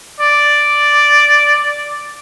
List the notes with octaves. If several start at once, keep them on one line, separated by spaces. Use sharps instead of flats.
D5